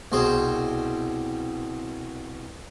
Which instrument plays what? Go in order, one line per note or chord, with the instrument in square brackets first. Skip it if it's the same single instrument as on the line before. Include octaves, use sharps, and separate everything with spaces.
[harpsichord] C2 B2 G#4 C5